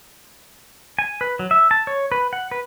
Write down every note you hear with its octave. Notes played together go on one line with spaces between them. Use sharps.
G#5
B4
F#3
E5
A5
C#5
B4
F#5
B4